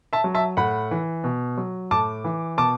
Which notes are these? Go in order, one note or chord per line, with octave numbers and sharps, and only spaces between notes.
E5 A5
F#3
E5 A5
A2 F#5 B5
E3
B2
F#3
A2 A5 D6
E3
B2 A5 D6